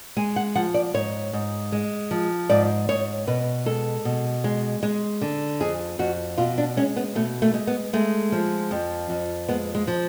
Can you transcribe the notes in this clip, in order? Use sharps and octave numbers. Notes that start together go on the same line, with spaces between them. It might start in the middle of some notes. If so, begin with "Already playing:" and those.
G#3 G#5
F#5
F3 F#5
D5
G#2 C#5
G#2
G#3
F3
G#2 D5
G#2 C#5
B2 B4
G#3 A4
B2
G#3
G#3
D3
F2 G#4
F2 F#4
B2 F4
D4
G#3 C#4
B3
B2 A3
A3
G#3
B3
G#3 A3
F3
F2
F2
G#3 B3
G#3
F3